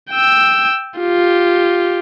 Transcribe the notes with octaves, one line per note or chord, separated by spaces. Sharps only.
G5 E6
F4 G4